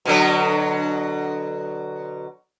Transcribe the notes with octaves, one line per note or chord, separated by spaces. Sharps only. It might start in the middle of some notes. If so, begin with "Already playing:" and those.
B2 D3 F#3